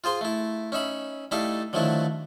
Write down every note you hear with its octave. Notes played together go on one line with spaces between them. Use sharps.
F4 G#4 C5 C6
A3 E4
C#4 D#4 E5 B5
G3 A3 D#4 E4 A4 F5
D3 D#3 F3 F#3 A3 E4